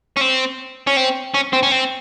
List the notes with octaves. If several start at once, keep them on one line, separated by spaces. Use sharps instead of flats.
C#4
C4
C#4
C4
C#4
C4
C#4
C4